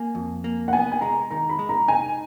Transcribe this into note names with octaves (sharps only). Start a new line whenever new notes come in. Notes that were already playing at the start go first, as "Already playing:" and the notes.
Already playing: A#3 G#5
F2
A#3
F#5
B3 G#5
G#5
G#3 A#5
D#3 A#5
B5
G#3
A#5
D#4 G#5